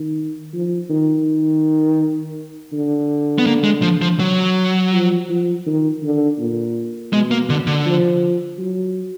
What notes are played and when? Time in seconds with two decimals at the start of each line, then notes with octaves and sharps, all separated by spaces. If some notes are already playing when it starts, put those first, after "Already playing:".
Already playing: D#3
0.54 F3
0.90 D#3
2.73 D3
3.39 B3
3.47 A#3
3.64 G#3
3.82 F3
4.02 F3
4.20 F#3
4.93 F3
5.29 F3
5.66 D#3
6.03 D3
6.39 A#2
7.13 B2 G#3
7.31 A#3
7.50 D3
7.67 D3
7.86 F3
8.58 F#3